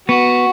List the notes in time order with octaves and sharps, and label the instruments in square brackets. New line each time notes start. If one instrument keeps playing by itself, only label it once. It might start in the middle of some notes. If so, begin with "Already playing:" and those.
[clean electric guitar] B3 [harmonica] F#4